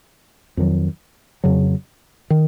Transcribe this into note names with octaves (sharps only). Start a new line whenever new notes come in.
F2 D#3 F#3
F2 C#3 F#3
D#3